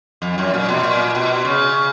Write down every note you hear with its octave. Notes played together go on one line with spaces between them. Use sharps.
F2
F#2
A#2
B2
A#2
B2
C#3